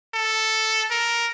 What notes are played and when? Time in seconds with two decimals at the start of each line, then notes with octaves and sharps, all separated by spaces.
0.14 A4
0.91 A#4